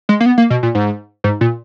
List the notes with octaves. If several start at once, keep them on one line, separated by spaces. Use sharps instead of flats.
G#3
A#3
B3
A#3
B2
A#2
G#2
G#2
A#2